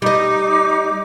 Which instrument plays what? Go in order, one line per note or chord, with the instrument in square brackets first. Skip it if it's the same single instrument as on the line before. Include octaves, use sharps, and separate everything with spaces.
[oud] G3 D#5 [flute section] D#4 D6